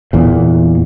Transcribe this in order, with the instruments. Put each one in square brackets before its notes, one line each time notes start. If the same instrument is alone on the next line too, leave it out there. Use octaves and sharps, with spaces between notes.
[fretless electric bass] E2 A#2